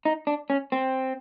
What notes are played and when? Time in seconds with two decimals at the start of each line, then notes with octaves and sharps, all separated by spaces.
0.05 D#4
0.27 D4
0.50 C#4
0.72 C4